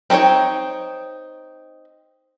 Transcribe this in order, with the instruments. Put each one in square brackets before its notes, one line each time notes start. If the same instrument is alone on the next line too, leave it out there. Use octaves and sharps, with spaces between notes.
[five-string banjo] C4 D#4 F#4 C#5 G5